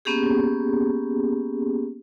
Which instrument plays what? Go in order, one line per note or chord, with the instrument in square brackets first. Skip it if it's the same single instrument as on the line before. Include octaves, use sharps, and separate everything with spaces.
[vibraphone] A#3 B3 C#4 G4 G#4